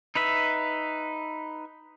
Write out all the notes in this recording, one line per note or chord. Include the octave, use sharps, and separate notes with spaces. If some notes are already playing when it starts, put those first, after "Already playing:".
D#4 B4 E5